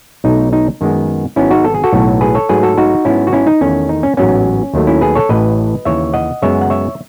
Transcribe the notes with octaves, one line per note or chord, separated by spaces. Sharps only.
B1 B2 A3 D#4
D#4
F#2 D#3 G#3 B3
G#1 G#2 F#3 B3 C#4 E4
D#4 F#4
A4
G#4
F#4 A4
B1 A2 F#3 B3
G#4 B4
A4 C#5
G#2 F#3 A3 G#4 B4
F#4 A4
D#4 F#4
G#2 F#3 B3 C#4 E4
F#4
C#4 E4
D#4
E2 D#3 A3 C#4
D#4
C#4
A1 G#2 F#3 B3 C#4
D#2 D#3 F#3 A3
C#4 E4
G#4 B4
A4 C#5
A1 A2 E3 B4 D#5
D#2 C#3 E3 C#5 E5
D#5 F#5
F#2 C#3 G#3 B3 C#5 E5
F#5
C#5 E5